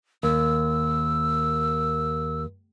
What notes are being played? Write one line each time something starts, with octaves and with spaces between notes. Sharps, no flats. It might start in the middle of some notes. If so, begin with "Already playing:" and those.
D#2 E6